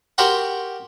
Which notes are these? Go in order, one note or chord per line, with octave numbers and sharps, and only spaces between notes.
F#4 G4 A#4 C5 F#5 G5